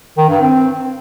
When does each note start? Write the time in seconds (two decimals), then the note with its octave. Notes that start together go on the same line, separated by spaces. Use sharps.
0.18 D#3
0.29 G2
0.41 C4